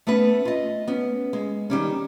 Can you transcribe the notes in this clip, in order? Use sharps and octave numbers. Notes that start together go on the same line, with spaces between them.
A3 B3 C#4 B4
F4 D#5
B3 C#4
G#3
D#3 G3 C#4